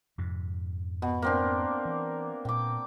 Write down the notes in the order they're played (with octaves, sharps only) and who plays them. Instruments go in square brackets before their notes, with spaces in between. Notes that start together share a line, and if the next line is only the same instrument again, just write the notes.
[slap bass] F2 G#2 C3
[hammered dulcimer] B2
A#3 C4 D4
[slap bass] E3
[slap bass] A#2 [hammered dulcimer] G5 D6